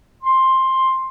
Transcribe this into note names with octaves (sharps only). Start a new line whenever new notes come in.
C6